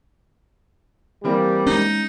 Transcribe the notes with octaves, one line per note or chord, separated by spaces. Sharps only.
E3 G3 A#3 C4
G#3 C#4 D#4